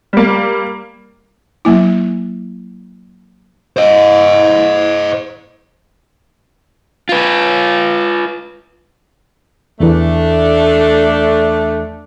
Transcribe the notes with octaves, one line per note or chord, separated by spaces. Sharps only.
G3 A#3
F#3 A#3 E4
C5 D#5
F4 B4
E2 E3 A3 D4